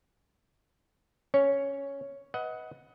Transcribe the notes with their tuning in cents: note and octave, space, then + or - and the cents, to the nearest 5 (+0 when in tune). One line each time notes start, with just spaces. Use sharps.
C#4 +5 C#5 +5
B4 +0 D#5 +25 F#5 +0